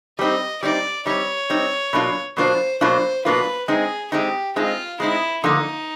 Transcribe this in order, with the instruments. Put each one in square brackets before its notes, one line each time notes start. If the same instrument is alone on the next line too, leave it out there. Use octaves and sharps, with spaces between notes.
[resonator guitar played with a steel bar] G3 C4 D#4 [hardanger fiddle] D#5
[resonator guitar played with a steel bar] G3 C4 D#4 [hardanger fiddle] D5
[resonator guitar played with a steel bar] G3 C4 D#4 [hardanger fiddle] C#5
[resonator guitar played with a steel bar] G3 C4 D#4
B2 F#3 A#3 D4 F4
[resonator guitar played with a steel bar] B2 F#3 A#3 D4 F4 [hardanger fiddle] C5
[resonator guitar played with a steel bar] B2 F#3 A#3 D4 F4 [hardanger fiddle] C5
[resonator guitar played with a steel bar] B2 F#3 A#3 D4 F4 [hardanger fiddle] B4
[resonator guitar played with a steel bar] G#3 C4 D#4 [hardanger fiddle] G#4
[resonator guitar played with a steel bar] G#3 C4 D#4 [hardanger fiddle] G4
[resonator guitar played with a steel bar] G#3 C4 D#4 [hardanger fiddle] F4
[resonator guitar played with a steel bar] G#3 C4 D#4 [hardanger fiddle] E4
[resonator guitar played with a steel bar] D3 F3 A#3 [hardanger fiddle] D#4